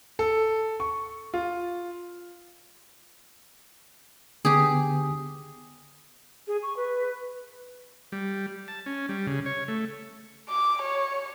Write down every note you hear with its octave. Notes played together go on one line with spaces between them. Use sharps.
A4
C#6
F4
D3 B3 G4 G#4
G#4
C#6
B4
G3
A5
C#4
G3
C#3
C#5
A3
D6
C#5